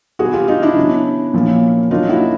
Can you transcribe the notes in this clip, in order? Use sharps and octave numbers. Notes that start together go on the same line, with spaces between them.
B2 G3 B3 F#4 G#4
F4 G4
D#4 F4
D4 E4
C#3 F#3 B3 D4
A#2 F3 A#3 C#4
C#3 F#3 A#3 D4 D#4 F4
E4 F#4